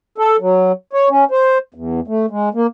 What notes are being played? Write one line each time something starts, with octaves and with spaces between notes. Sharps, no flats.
A4
F#3
C#5
C#4
C5
E2
A3
G#3
A#3